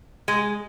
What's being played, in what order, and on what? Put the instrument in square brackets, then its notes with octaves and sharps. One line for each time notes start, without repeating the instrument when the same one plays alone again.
[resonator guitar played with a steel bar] G#3